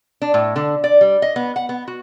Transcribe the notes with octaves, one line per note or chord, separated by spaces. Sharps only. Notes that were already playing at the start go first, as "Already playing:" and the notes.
D4
A2
D3
D5
G3
D#5
B3
F#5
B3
F#4